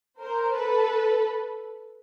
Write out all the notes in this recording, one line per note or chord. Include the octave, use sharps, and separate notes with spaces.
A#4 C5
A4 B4